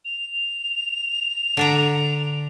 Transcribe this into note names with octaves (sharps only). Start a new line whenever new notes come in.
F7
D3 D4 A#5